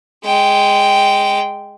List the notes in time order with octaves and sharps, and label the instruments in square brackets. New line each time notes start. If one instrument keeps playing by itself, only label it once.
[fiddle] G#3 G5